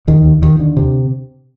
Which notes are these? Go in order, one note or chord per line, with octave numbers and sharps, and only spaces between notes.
D#2 D#3
D#2
D#2 D#3
D3
C3